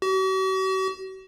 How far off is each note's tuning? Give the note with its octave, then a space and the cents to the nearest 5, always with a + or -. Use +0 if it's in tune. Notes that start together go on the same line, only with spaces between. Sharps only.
F#4 +45